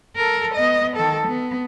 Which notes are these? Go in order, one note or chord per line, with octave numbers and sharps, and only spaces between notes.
A4 A#4
B3 D#5
D#3 A4
B3